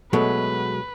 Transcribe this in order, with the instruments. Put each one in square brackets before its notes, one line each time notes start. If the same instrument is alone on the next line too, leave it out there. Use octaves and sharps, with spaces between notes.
[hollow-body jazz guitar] B2 F#3 G#3 [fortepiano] A3 [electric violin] B4